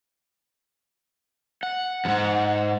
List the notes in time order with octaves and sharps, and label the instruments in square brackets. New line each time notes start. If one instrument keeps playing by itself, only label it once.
[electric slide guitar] F#5
[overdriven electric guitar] F2 G#2